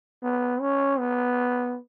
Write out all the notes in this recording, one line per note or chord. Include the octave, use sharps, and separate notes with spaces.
B3
C#4
B3